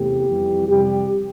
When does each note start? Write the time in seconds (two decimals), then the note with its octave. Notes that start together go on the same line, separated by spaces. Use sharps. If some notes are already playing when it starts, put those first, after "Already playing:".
Already playing: E2 C3 A3 G4
0.29 F2 E3 G3
0.68 F2 C3 G3 G4